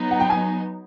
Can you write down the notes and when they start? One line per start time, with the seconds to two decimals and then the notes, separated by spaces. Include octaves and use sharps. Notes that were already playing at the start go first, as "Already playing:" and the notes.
Already playing: F#3 B3 D#4
0.11 F#5
0.20 G5
0.30 G#5